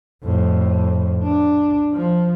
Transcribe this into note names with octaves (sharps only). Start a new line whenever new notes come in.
F2 A2
D4
F3